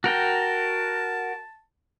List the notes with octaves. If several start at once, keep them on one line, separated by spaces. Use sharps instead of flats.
F#4 A#4 G5 A5